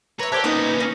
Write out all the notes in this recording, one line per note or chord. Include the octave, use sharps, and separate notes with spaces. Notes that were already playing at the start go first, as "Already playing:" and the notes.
B4 C#5 E5 A#5 A#6
G4 A#4 C5 D5 E5 A5 F#6 G#6
A#2 B3 C#4 D#4 B4 D#5 A#5 D#6
D#4 C#6 F6 A#6